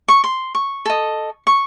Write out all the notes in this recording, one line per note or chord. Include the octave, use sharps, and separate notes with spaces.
C#6
C6
C#6
A4 D#5
C#6